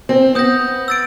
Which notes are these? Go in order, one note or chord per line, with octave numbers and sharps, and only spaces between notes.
C4
B3 D#6 G6 A#6
E6 A6 D7